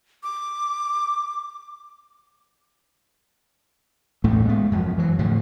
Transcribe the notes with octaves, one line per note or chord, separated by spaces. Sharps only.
D6
A1 A2 A3 A#3
G#3 B3
F#2 F3
E3 F#3
A2 D3 F3